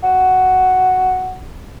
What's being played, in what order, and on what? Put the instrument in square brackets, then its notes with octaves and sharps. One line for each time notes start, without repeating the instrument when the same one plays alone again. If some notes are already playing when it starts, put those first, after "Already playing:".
[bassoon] F#4